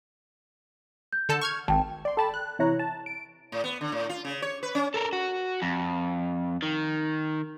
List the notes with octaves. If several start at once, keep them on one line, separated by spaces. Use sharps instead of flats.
G6
D3 A4 A5
C#6 F6 G#6
G#1 G5 A5
D5 C6
A4 G5 A5 B5
F#6
C3 E3 E4 C#5 A#5 F#6
A5
D7
A2
B3
D3
A2
F4
C#3
C#5
B4
C#4
A4 A#4
F#4
F2
D#3